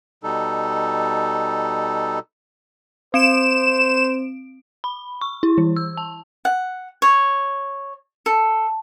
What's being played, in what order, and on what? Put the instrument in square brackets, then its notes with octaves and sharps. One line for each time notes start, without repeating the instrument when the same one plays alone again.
[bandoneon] B2 G3 D#4 A4
[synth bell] C4 D7 [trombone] C5 [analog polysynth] E7
[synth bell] B5
C#6
E4
E3
E6
A5
[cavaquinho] F#5
C#5
A4